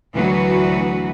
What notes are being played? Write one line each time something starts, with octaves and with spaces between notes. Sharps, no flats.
D2 E3 F#3 F#4 B4